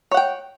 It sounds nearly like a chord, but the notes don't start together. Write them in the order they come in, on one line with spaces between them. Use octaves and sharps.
C#5 F#5 G5